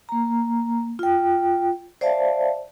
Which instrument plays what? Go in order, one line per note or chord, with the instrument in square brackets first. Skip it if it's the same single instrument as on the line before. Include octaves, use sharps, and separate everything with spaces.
[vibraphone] A#3 A#5
F4 G5
C5 D5 E5 F5 A5